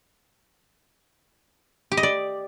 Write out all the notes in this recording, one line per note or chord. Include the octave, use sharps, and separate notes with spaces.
G4
D#5
D5